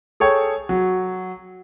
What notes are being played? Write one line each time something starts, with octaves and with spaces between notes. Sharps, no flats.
G#4 A4 C#5 G5
F#3